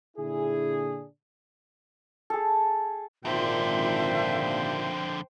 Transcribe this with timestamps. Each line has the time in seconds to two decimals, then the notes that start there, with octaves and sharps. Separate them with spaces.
0.17 A#2 D3 D4 E4 G#4
2.30 G#4 A4
3.25 G#1 F2 A#2 D3 C5 E5 G5